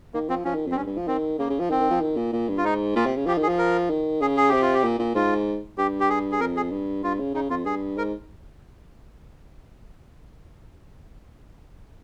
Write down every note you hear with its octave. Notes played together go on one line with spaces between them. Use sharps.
D#3 A#3
F3 C4
F3 C#4
D#3
F2
C4
G2 C#4
G2
F3
D#3 C4
C#3 A#3
C#3
F3
D#3 C4
D#3
F3
D#3
A#2
A#2
G2
F4
G#2 D#4
A#2 F4
C3
C#3
F3 G4
D#3 G#4
F3
A#4
D#3
C#3 G#4
G#4
C3 G4
F4
G4
A#2
A#2
G#2 F4
G2 G4
G4
G#4
G#4
F2 A#4
G#4
G2
G2 F4
C#3
C#3 D#4
F2 F4
G2 G#4
G#2 A#4